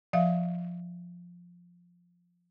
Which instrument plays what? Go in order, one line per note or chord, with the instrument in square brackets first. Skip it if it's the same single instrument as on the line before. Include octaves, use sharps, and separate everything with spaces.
[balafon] F3 E5 F5